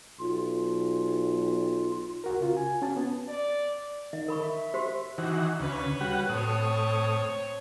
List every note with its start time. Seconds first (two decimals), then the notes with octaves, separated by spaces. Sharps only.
0.20 B1 F4
2.24 C2 F#4 A#4
2.40 C#3 F4 F#4
2.57 G#5
2.82 C#4 F#4 A5
2.97 B3
3.29 D5
4.13 D#3 D#5
4.28 A#4 B5 C#6
4.44 E5
4.74 F#4 G4 C5
5.18 D#3 E3 F#4
5.60 D2 C#3 B4 C#5
6.01 G3 F#4 F#5
6.29 A2 C4 C#5 D#6